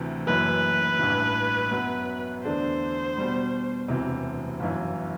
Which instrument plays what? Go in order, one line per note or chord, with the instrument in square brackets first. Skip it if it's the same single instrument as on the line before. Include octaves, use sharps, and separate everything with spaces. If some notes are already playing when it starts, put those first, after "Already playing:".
Already playing: [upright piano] D2 C3 E3
[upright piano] F#1 F#2 E3 [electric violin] B4
[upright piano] A1 G2 E3
F#2 F#3 B3 F#4
[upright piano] E2 D3 A3 D4 [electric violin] C5
[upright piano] B2 G3 B3
E1 D2 C3 E3
G1 F#2 E3